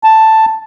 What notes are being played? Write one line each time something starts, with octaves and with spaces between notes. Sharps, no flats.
A5